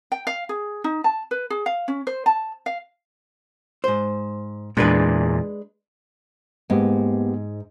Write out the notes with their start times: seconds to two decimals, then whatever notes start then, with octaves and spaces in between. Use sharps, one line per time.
0.12 G5
0.27 F5
0.49 G#4
0.84 D#4
1.04 A5
1.31 B4
1.50 G#4
1.66 F5
1.88 C#4
2.07 C5
2.26 A5
2.66 F5
3.84 G#2 C5
4.77 E2 A#2 G#3 D4 B4
6.70 G#2 A#3 B3 G4